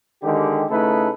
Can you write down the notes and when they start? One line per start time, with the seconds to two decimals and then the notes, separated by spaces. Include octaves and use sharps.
0.23 D3 D#3 G#3 G4
0.70 C#3 A3 D#4 E4 A4 B4